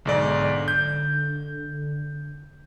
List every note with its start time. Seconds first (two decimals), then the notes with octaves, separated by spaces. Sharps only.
0.05 B1 G#2 D3 D5
0.68 G6